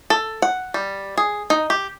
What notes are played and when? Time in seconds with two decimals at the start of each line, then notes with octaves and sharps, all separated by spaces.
0.10 A4
0.42 F#5
0.74 G3
1.18 G#4
1.50 D#4
1.70 G4